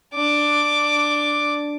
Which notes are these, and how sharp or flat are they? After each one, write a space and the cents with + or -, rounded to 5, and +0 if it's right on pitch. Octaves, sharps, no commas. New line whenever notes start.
D4 +5 D6 +0